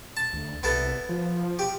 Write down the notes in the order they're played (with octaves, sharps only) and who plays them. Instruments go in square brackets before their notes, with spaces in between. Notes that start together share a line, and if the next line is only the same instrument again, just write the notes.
[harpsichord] A5
[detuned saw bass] D2
[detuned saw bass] C2 [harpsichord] B3 E4 A4
[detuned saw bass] F3
[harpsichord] G4